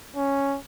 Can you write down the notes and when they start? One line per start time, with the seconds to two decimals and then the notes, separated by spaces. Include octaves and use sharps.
0.16 C#4